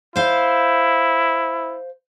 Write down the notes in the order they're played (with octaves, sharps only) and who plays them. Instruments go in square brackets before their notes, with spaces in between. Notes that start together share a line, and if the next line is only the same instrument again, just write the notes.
[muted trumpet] E4 [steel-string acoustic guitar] C5 F5